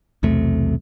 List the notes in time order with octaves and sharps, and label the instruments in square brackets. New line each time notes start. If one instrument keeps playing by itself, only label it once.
[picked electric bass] B1 E2 C3 A3